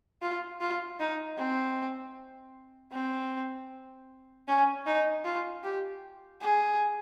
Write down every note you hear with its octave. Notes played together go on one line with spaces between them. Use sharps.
F4
F4
D#4
C4
C4
C#4
D#4
F4
G4
G#4